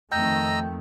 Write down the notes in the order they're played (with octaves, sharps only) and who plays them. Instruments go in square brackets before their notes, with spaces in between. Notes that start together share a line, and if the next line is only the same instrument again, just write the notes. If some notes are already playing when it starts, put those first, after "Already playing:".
[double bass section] F2 D#3 A3 [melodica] D#5 A#5 E6 [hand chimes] G5 G6